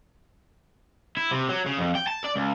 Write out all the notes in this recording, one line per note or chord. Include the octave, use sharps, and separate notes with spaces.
E4
C3
F#3
C#3
F2
G5
A5
D5
C#2